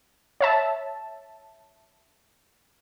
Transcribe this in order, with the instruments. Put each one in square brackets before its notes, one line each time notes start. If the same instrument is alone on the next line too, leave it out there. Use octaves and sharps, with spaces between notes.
[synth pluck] C#5 E5 A5